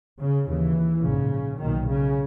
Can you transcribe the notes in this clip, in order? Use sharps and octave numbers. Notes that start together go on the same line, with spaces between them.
C#3
D#2 C#3 E3
A#1 G#2 C#3
B1 A#2 D#3
C#3